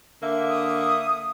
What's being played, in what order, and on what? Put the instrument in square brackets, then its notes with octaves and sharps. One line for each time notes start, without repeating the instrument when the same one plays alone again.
[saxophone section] D3 A#3 E5
[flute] D#6